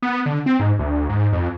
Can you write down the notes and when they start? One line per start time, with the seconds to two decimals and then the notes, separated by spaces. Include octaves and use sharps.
0.02 B3
0.26 D3
0.46 C4
0.60 G#2
0.79 D2
1.09 G#2
1.32 F2